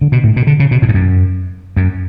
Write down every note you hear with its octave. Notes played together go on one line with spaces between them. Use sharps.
D3
B2
A2
B2
D3
C#3
B2
A2
G#2
F#2
F#2